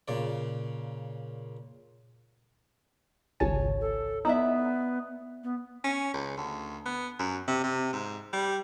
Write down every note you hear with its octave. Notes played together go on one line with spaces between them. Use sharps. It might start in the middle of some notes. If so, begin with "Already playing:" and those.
A#2 C#3 D5
G#1 C#2 C#5 G#5 A5
A4
B3 D#4 E4 D5 E5
B3
C#4
C#2
D2
B3
F#2
C3
C3
G#2
G3